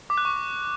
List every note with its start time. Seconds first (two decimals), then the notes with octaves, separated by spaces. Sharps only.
0.10 D6
0.18 F#6
0.25 C#6